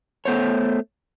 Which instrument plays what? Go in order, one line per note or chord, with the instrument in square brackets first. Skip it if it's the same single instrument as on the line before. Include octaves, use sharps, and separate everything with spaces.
[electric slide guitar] A3 B3 C5 C#5